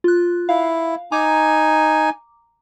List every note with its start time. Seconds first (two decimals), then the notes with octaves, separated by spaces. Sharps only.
0.04 F4 F#6
0.49 E4 F5
1.12 D#4 G#5 A#5 D6